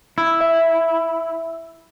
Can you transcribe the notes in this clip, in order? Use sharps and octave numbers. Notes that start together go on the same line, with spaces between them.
E4
E5